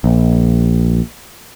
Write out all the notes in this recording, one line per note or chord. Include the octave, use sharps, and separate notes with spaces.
A#1